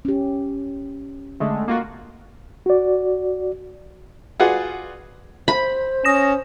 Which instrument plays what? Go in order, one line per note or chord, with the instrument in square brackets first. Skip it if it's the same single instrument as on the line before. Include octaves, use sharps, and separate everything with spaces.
[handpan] C#4 G4
[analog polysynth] D3 G#3 A3
A#3 F4 F#4
[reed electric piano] F#4 D5
[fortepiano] F4 F#4 G#4 B4 D5 F#5
[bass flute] C5 [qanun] B5
[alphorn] C#4 [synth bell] D#6 A#6 E7